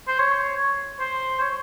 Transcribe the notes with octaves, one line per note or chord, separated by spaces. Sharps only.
C5
C#5
C5
C#5